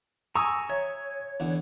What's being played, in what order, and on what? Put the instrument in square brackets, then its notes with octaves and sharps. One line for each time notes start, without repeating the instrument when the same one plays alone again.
[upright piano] G#5 D#6 E6 [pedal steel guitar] A#5 C#6
[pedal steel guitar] C#5 [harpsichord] E5
[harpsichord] E2 D3 F#5